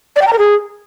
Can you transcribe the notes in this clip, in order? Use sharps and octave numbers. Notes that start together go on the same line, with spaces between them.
D5
G5
A#5
A#4
G#4